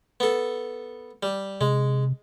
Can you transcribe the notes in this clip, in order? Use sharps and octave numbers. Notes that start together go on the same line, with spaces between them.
B3 A4
G3
C3 G#3